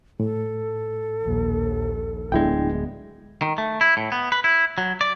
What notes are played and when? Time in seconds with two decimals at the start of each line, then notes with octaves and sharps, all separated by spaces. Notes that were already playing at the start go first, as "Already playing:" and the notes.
0.20 A2 A4
1.22 A#1 D#2
2.32 D1 G#3 B3 D4 E4 G5
3.42 D#3
3.58 A3
3.81 E4
3.97 A2
4.12 B3
4.32 B4
4.44 E4
4.78 F#3
5.01 D5